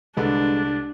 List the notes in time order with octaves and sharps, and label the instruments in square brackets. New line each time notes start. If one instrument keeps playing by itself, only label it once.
[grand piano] C2 D3 B4 [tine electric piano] G#3 A4 [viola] D4